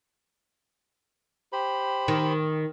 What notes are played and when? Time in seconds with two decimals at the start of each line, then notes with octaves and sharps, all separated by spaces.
1.53 G4 C5 B5
2.08 D#3